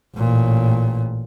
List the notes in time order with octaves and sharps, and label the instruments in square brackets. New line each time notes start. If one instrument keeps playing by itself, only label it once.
[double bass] A1 A#2